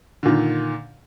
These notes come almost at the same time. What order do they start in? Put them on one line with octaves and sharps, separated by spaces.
D3 A#2 D#3